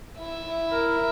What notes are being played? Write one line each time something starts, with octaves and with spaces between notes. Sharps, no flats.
E4 E5
E4
A#4